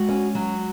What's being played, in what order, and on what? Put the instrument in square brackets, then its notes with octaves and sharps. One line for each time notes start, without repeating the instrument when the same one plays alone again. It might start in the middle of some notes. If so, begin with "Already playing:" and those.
Already playing: [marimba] G#3 [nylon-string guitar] F#4
[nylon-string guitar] C#4
F#3